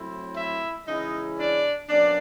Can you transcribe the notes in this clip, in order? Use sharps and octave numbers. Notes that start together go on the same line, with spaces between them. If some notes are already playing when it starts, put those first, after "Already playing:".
Already playing: A2 F#3 A3 C4 E4
E4 E5
C#3 E3 G#3 C#4 D#4 E4 D#5
D4 D5
B2 F#3 A#3 C#4 D4 D5